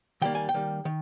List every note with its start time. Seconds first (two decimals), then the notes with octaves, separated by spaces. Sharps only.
0.22 D#3 G3 A#3 G5
0.35 G#5
0.49 G5
0.54 D#3 G3 A#3
0.85 D#3